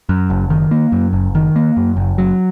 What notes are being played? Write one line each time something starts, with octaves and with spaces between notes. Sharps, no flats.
F#2
F#1
D#3
A#3
F#2
F#1
D#3
A#3
F#2
F#1
F#3